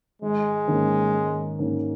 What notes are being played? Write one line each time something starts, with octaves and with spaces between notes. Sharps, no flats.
G#1 G#3
G#2 D#3 A#3 C#4
G#1
G#2 D#3 A#3 C#4